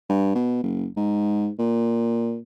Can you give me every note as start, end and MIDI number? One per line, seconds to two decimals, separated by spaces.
0.09 0.32 43
0.35 0.59 47
0.63 0.87 30
0.96 1.49 44
1.59 2.39 46